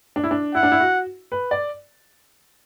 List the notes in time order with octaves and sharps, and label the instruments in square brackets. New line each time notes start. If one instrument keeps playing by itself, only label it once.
[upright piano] D4
E4
D4
[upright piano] E4 [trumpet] F#5
[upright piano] D4
E4
F#4
B4
D5